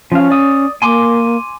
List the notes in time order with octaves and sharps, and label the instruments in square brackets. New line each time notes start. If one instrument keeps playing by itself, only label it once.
[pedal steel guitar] F3 F5 [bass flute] C#4
[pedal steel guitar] D5 D#6
[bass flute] A#3 [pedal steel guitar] G#5 C6 D6